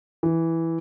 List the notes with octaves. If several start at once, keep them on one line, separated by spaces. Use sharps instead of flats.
E3